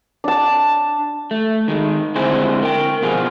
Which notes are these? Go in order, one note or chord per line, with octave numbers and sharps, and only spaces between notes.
D4 A5
A3
D#3 G#3
D3 G#3 C4 E4 G#4 C5
A#4 G5
B2 F3 F4 G#4